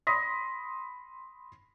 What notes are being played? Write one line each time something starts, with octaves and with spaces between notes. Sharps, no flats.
B5 C6 D#6 A#6 B6